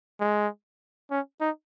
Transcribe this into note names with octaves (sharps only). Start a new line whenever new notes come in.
G#3
C#4
D#4